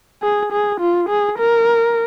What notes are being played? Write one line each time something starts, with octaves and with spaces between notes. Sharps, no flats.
G#4
G#4
F4
G#4
A#4